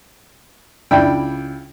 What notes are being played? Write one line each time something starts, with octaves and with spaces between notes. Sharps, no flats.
C#2 D4 E4 G5